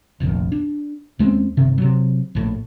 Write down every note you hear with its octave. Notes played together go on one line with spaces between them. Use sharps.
F1 A#1 F2 D#3
D4
D#2 G#3 C4 C#4
G1 C3 D#3
C3 F#3
A#1 A2